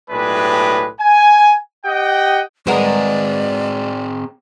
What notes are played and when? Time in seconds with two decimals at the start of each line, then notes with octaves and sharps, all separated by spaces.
0.11 B1 A2 G#3 D4 G4 B4
1.00 G#5
1.86 G4 D#5 F#5 G5
2.67 G#3 C4 G#4 A#4 B4 D5 D#5 F#5